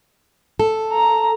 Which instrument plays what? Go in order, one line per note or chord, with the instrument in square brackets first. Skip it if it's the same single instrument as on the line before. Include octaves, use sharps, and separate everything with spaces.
[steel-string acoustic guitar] A4
[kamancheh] A#5